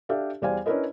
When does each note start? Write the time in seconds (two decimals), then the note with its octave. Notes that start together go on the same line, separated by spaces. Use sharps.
0.09 D4 G4 A4 E5 F5
0.42 E2 G3 C5 D5 F5 G#5
0.66 C#4 D4 E4 A#4 B4 D#5